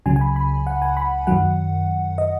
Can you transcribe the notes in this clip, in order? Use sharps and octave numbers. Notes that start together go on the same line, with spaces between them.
C#2 C#3 F#3 G#5
G#5
B5
B5
F#5
G#5
B5
F#2 D#3 F#3 F#5
D#5